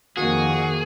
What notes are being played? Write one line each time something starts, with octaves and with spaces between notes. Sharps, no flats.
F2 D#3 A#3 F#4 G#4